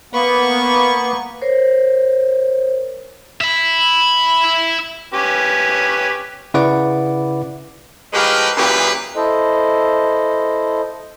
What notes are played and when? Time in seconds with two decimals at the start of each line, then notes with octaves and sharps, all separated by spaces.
0.13 A#3 B3 B4 C#6
1.41 A#4 C5 C#5
3.41 E5 B5
5.14 C#4 G4 B4
6.54 C#3 E4 B4 D5 F#5 D6
8.14 A2 F3 G#3 G4 A#4 B4
8.57 F#2 A#2 E3 G4 G#4 B4
9.16 E4 A4 C5 D#5